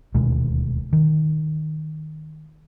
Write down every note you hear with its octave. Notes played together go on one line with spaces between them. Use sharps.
D#1 D2 B2 G#3
D#3